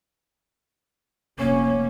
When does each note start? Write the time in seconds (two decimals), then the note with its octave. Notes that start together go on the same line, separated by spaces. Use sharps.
1.39 F1 A#3 C#4